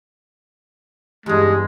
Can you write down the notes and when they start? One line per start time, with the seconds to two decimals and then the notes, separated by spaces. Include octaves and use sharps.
1.26 E2 G2 G#3 G4